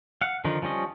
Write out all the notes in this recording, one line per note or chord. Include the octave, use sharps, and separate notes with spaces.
F5 F#5
D3 D#3 F3 D#4
F3 G3 C#4 D#5